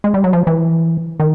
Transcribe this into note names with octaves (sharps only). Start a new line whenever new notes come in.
G#3
G3
F#3
F3
E3
D#3